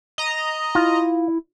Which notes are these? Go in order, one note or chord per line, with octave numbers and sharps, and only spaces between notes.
D#5 A#5
E4 F4